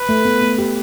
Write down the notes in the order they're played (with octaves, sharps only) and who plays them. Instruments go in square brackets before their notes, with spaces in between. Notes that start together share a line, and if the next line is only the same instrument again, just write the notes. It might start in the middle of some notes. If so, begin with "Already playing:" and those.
Already playing: [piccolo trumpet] B4
[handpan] A3
B3
B3
G4